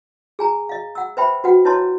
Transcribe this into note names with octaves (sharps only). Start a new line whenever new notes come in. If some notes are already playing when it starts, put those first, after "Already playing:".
G#4 G#5 A#5
D#5 F5
F#5 E6
B4 C5 E5 G5 B5
F#4 B4 F#5 G5
E4 B4 C#5 D#5 A5 C6